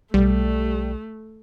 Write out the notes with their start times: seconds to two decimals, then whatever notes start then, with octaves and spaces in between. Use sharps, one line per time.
0.14 B1 G3 A3